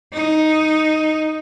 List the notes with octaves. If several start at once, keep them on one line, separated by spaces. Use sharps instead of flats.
D#4